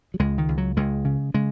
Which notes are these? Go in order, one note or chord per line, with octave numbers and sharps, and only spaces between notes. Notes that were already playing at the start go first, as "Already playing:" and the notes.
F#3
C#2 G#3
D#3
C#2
F#3
C#2 G#3
C#3
C#3 G#3